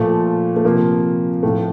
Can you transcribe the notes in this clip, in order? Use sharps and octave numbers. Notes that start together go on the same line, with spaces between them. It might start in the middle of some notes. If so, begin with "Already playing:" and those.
Already playing: A#2 F3 A3
A3
C3 F3 A#3
A2 F3 A3